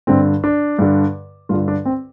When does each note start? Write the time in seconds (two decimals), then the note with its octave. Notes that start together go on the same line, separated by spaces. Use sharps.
0.07 G2 D3 C4
0.44 D4
0.79 G2 D3
1.49 G2 D3 F4
1.68 D4
1.85 C4